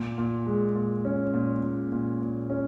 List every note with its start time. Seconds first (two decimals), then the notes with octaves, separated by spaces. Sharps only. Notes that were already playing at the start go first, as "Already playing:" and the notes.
Already playing: A#2
0.18 A#2
0.46 G#3
0.75 A#2
1.05 C#4
1.34 A#2
1.62 A#2
1.92 A#2
2.21 A#2
2.50 C#4